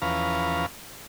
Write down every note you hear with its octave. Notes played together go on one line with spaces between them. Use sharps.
E2 F3 C#4 B4 F5 A#5